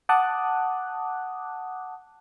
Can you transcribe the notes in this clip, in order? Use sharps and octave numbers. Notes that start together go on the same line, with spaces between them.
F#5 A5 D6 D#6 F#6